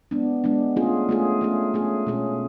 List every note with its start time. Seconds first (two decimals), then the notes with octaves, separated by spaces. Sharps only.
0.11 G#3 B3 D4
0.44 G#3 B3 D4
0.76 A3 C#4 F4 G#4
1.09 A3 C#4 F4 G#4
1.41 A3 C#4 G#4
1.74 A3 C#4 G#4
2.07 B2 G#3 C#4 G#4